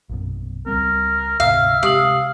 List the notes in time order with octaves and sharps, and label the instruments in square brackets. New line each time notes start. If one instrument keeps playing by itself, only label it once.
[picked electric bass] A#1 F#2 B2
[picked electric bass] C#2 G3 C4 [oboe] A#4
[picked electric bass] D2 G#2 C3 [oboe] E5 [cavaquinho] F5
[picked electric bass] C3 G#3 [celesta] G4 D#6 F#7 [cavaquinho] F5